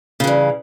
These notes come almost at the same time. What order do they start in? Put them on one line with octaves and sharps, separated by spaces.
C#3 E3 G2